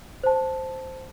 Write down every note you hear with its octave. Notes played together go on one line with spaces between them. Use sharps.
C5 A5